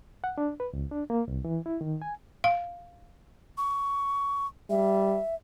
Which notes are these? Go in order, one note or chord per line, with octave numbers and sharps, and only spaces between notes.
F#5
D4
B4
C#2
D4
A#3
C2
E3
E4
D#3
G#5
F5
C#6
G3 E5